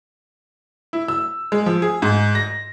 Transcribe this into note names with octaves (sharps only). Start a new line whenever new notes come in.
E4
E6
G#3
F3
G#4
G#2
A#6